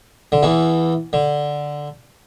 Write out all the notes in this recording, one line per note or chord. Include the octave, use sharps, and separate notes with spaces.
D3
E2 E3
D3